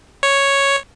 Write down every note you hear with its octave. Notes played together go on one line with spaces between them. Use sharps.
C#5